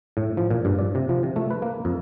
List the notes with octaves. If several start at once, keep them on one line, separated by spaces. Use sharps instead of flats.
A2
F3
A#2
G2
D5
C3
F3
C3
A3
B4
A#3
F2